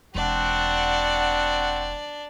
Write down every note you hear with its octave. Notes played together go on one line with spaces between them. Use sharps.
E1 E2 C4 D4 F#4 D5 F#5